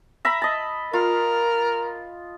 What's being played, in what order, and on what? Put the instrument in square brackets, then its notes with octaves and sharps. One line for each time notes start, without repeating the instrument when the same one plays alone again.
[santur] E5 A#5 B5
D#5 A5
[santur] F4 [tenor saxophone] A#4